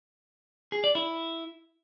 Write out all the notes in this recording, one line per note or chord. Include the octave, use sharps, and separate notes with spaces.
G#4
D5
E4